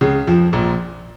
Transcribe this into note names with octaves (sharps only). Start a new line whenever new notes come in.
C#2 C#3
F2 F3
A#1 A#2